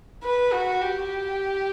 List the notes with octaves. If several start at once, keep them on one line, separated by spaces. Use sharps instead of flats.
B4
F#4
G4